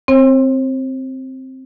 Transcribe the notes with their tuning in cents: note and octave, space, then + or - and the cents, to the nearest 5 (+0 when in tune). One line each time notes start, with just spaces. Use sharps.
C4 +0 C5 +45